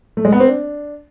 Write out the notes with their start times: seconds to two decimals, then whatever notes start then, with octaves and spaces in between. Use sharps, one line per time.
0.17 A3
0.25 G#3
0.32 B3
0.40 C4
0.48 D4